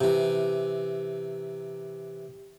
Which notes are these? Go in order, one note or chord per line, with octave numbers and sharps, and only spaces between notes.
C3 E3